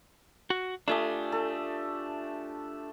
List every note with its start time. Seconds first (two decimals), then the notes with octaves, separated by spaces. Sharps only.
0.50 F#4
0.88 A3 D4 F4 G4 G#5 D#6
1.32 A4